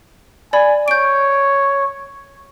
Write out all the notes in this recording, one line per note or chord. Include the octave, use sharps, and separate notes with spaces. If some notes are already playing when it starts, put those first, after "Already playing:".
D5 G#5 B5
C#5 G6 D7